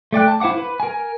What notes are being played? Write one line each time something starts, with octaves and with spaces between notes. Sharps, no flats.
A3 D5 G5 F#6
A5
E4 C5 F5 F#5 D6
B4
A#4 G#5